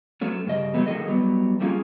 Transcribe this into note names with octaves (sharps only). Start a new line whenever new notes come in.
F#3 A3 C#4
G2 C#3 D#5
F#3 G3 A3 B3
A2 D#3 A3 G#4 A4 D#5
F#3 G3 B3
G3 A3 A#3 C#4 F4 G#4